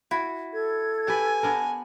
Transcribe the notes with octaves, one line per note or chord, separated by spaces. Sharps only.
E4 F#4
A4 G#6
G4 B4 G#5
B3 D4 A#4